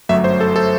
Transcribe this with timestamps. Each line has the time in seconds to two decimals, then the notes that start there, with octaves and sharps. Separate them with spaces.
0.09 G1 F#2 F#3 A3 E5
0.24 C5
0.40 A4
0.56 A4